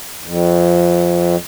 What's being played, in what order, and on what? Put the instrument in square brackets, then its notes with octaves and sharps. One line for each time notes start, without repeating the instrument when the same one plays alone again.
[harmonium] F2